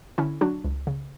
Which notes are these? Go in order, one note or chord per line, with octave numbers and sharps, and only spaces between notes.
D3 C#4 E4
F#3 D4 F#4
C#2
C#3